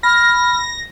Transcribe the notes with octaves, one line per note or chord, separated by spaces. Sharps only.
B5 F6 A#6